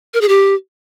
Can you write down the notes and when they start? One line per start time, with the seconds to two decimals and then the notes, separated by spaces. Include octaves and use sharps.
0.14 A#4
0.21 G#4
0.29 G4